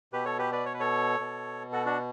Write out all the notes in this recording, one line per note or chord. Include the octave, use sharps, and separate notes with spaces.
B2 G4 B4
A4 C#5
G4 B4
B4 D5
C#5
B4
A4 C#5
B2
F#4 A4
D4 F#4